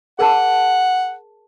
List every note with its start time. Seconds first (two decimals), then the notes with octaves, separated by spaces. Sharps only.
0.19 G#4 A#4 F#5 A5